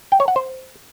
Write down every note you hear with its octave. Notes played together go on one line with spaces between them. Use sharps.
G5
C#5
F#5
C5